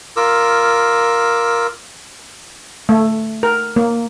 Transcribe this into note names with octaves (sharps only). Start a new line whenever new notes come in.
F4 A#4 D6 E6
A3
A#4
A#3